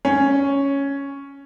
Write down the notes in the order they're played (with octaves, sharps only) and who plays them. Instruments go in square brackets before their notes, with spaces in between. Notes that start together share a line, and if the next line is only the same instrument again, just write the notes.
[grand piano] C#4